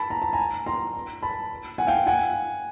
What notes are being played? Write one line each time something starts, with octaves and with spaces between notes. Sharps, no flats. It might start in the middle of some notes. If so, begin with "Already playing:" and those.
Already playing: A5 B5
A#5
A5
G#5 A#5
A#5 C6
A5 B5
F#5 G#5
F5 G5
F#5 G#5